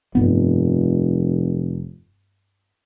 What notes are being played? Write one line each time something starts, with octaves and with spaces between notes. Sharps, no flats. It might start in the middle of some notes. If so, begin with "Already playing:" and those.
F1 G2 B3